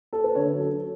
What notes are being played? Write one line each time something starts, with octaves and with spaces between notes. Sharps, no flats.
A4
B4
D3 C#5
F#3
A4